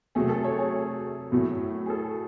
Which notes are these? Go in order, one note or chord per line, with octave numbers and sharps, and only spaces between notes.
C3 F#3 A3 G#4
A4
C#5
G#4
A2 F#3 A3
G#4
A4